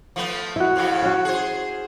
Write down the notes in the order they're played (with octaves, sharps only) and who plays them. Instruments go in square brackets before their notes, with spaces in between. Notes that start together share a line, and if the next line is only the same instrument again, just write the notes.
[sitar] F3 A3 B3
[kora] E4 F#4
[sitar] F2 C#3 C4
[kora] C#4 F#4
[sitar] G#4 C5